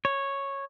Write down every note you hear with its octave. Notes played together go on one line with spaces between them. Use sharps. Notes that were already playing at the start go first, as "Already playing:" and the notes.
C#5